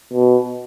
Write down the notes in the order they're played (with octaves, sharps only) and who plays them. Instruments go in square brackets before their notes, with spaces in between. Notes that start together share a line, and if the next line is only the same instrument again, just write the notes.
[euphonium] B2